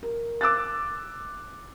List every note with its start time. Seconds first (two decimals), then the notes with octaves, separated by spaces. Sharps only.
0.03 A#4
0.41 D6 E6 F#6 A6